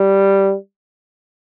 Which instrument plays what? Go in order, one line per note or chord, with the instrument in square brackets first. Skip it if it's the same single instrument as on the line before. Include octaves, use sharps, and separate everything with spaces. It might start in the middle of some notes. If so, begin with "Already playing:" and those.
Already playing: [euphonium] G3